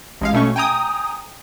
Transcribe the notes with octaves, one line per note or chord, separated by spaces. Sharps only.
A1 G#3 F5
B2 A3 C#4 C#6
G5 G#5 A#5 D#6